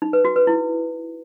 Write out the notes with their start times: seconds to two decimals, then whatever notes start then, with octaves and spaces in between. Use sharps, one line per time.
0.02 D#4
0.13 B4
0.25 F#4
0.36 B4
0.47 E4